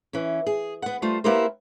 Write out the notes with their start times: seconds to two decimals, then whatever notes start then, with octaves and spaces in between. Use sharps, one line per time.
0.13 E3 C#4
0.47 G#4
0.82 B3 F#5
1.02 G3 A3 F4 C5
1.24 A#3 B3 E4 G4 A#4 C5